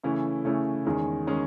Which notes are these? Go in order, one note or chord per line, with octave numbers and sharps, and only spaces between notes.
C#3 E3 A3 C#4 E4
C#3 E3 A3 C#4 E4
E2 D#3 G#3 C#4 G#4
D#3 G#3 C#4 G#4